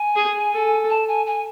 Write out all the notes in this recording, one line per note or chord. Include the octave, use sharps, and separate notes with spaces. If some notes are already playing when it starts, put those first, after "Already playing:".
Already playing: G#5
G#4
A4
A5
G#5
G#5